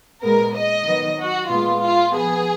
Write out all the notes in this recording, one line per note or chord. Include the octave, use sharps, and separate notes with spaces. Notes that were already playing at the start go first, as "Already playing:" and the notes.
A#2 G#3 B3 A#4
D#5
D#3 F#3 B3
F#4
A#2 G#3 B3 F4
F4
F3 B3 G#4